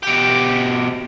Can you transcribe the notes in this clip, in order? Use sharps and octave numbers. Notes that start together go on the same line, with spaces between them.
B2 G4